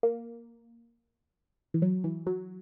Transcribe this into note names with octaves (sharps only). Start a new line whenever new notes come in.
A#3
E3
F#3
E3
F#3